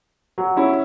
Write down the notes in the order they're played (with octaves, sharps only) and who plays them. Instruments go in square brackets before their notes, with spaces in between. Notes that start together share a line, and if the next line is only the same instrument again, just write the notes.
[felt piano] F#3
[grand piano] C#4 E4